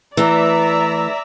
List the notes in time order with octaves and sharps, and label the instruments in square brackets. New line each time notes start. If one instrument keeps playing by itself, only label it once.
[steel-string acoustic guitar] E3 A3 [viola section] D5 E5 A#5